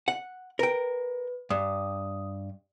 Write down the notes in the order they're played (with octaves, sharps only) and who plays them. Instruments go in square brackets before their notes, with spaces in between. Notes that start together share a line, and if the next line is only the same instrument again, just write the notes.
[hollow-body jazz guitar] F#5
[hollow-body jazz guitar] A#4 G5 [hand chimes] B4
[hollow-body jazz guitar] G2 [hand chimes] D#6